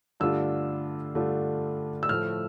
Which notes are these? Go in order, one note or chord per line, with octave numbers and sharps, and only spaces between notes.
G2 D3 A3 D4 F4 E6
G2 D3 A3 D4 F4
E6
A2 F3 A3 F6